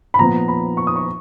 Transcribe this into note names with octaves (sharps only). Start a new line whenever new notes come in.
B5
A#2 F3 B3 A#5
B5
C#6
D#6
C#6